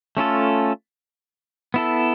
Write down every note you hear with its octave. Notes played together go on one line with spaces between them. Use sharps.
A3 C#4 F4 A4
B3 E4 A4